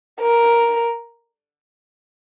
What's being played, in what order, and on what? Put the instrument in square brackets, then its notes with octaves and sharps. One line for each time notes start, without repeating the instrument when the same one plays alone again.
[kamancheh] A#4